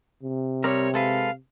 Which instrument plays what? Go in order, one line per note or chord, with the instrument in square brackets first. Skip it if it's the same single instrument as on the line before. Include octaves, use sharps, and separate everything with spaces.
[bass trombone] C3
[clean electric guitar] G3 C4 A#4 [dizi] C#5
[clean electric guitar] G#3 A4 B4 [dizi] F5